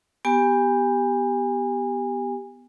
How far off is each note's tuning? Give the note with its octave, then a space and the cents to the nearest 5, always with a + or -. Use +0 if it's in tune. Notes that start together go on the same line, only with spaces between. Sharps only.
B3 +0 G4 +0 G#5 -25